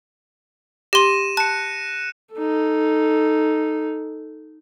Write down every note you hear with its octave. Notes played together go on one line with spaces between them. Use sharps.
G4 C6 A#6 D#7 E7
A5 F#6 C#7
D#4 A4